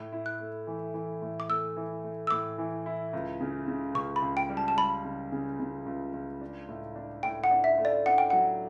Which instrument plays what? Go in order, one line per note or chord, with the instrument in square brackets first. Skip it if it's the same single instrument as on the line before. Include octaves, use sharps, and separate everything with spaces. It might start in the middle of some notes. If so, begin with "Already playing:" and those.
Already playing: [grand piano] A2
E4
[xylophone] F#6
[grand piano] A3
E3
E3
A2
[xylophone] D6
[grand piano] A3 [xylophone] E6
[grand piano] E3
A3
[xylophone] E6
[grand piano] A2 [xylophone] D6
[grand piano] E3
E4
C#2
C#3
C#3
[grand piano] C#2 [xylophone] C#6
[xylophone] B5
[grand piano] C#2
[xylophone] G5
[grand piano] G3
[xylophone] A5
A5
[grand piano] G3 [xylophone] B5
[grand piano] C#3
C#3
C#3
C#2
C#2
D4
A2
D4
[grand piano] A2 [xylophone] G5
[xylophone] F#5
[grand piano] D4
[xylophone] E5
[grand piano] A3
[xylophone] D5
[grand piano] D4 [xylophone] F#5
[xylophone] G5
[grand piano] F#3 [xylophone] F#5